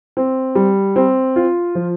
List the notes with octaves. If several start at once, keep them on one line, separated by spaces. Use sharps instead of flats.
C4
G3
C4
F4
F3